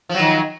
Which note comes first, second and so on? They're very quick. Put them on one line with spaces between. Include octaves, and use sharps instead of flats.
F3 F#3 D#3